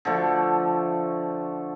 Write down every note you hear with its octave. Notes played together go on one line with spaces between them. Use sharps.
D3 F3 A3